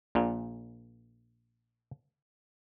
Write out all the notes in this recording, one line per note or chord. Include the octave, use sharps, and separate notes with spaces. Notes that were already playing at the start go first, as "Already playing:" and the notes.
A#1 A#2